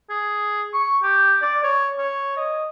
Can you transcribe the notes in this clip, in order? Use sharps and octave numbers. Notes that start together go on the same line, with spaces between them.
G#4
C#6
G4
D5
C#5
C#5
D#5